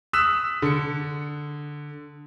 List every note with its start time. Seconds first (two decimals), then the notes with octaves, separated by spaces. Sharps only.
0.13 D#6 E6 F#6 B6 E7
0.62 D3 C#7